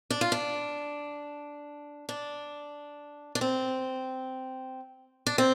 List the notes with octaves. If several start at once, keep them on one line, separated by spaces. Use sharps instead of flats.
D4
F4
D4
D4
D4
C4
D4
C4